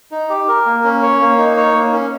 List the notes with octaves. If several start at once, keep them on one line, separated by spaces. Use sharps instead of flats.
D#4
G4
A#4
A#3
C#4
C#5
A#3
D#4
C#5
A#3
C#4